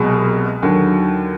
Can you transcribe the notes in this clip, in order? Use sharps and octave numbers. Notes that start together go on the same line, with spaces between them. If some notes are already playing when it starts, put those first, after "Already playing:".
Already playing: C2 B2 F#3 G#3
D#2 D3 F#3